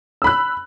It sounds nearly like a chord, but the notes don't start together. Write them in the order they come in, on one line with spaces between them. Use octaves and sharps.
E6 B5 F#6